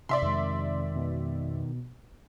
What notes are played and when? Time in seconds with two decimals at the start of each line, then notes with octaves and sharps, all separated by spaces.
0.09 C3 D5 E5 C6
0.22 F2 D#3 G#3
0.95 B2